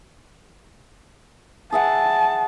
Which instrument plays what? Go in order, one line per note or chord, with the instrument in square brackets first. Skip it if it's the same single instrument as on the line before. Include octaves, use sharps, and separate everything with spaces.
[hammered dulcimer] G#4 E5 F#5 [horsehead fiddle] A5